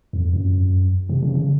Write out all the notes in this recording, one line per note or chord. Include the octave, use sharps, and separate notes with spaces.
F2
F#2
C3
C#3
C#3